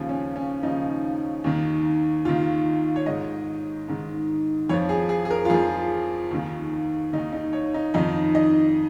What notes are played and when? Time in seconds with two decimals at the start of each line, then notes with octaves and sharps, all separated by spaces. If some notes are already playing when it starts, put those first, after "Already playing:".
Already playing: D#2 C#3 F3
0.09 C#4
0.36 C#4
0.63 D#2 C#3 F3 D#4
1.44 D#2 D#3
2.25 D#2 D#3 F4
2.96 C#5
3.06 G#2 D#3 D#5
3.88 G#2 D#3
4.69 F2 F3 C#5
4.89 G#4
5.09 G#4
5.25 G#4
5.31 A#4
5.45 F4
5.50 F2 F3 G#4
6.31 D#2 D#3
7.13 D#3 D#4
7.18 D#2
7.33 D#4
7.53 C#5
7.74 D#4
7.94 F2 D#3 D#4
8.35 D#5